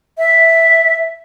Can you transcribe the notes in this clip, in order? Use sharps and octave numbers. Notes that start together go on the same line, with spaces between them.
E5